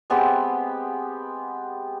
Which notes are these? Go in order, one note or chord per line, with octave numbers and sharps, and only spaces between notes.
G#3 B3 C4 G4